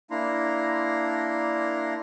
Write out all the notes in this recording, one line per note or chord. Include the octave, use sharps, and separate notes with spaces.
A#3 D4 E4 A#5 C6